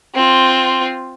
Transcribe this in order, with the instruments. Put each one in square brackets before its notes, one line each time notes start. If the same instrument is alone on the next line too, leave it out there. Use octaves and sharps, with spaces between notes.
[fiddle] C4 F4